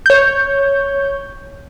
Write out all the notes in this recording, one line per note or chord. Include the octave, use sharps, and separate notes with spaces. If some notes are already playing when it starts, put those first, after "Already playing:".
C#5 G6